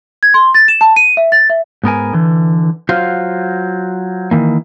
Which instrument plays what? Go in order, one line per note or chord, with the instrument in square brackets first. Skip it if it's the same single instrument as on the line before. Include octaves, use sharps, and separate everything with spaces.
[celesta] G#6
C6
A6
E7
A5
D#7
E5
A6
E5
[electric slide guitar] G#2 B3 A#4 G#5
D3 E3
F#3 F4 F#4 C5 F5
D#3 E3 A#3